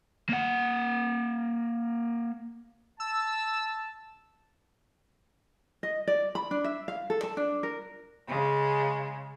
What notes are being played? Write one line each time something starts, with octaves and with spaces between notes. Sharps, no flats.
A#3 F#5
A5 E6
D#5
D5
B5
D4
E5
F5
A4
A5
D4
A#4
C#3 G#3